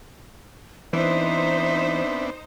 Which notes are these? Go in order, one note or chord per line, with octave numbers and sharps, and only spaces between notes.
E3 B3 C4 D4 D#4 C5 E5